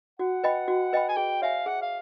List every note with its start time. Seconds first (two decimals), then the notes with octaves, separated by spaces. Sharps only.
0.19 F#4 F#5
0.44 B4 D#5 G5 B5
0.68 F#4
0.93 B4 D#5 G5 B5
1.09 G#5
1.17 G#4 G5
1.42 C#5 E5 F5 G#5
1.66 G#4 F#5
1.82 F5